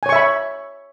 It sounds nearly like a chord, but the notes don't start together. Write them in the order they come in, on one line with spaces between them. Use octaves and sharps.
G#5 C#5 C#6 E5 B5